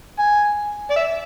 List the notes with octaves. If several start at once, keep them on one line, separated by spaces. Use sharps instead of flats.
G#5
D5
E5